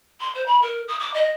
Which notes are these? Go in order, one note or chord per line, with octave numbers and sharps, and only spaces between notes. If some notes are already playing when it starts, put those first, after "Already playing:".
C6
C5
B5
A#4
D#6
D6
D#5